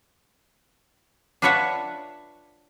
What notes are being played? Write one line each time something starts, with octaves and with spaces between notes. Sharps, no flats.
D4 F4 B4 C#5 E5 F#5